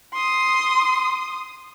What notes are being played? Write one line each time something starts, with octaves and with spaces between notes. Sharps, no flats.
C6 D#6